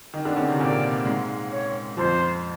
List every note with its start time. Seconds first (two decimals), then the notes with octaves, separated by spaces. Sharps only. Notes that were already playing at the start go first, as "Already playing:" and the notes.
0.14 D#3 D#4
0.25 D3 D4
0.36 C#3 C#4
0.48 C3 C4
0.60 A#2 A#3 D5
1.05 G#2 G#3
1.51 C#5
1.97 F2 F3 C5